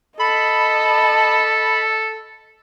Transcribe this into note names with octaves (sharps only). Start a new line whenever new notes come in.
A4 D#5 A5 B5